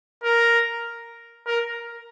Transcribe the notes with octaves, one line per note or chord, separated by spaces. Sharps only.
A#4
A#4